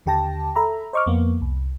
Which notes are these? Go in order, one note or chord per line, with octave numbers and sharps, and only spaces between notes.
D#2 D3 G4 G5 A5 A#6
A4 E5 A#5 B5
C5 D#5 C#6 D6 F6
F2 A#3 B3
C2